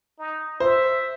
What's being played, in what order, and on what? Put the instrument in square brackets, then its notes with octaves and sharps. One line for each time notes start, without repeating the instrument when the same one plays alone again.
[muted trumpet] D#4
[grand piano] C5 [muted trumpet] E5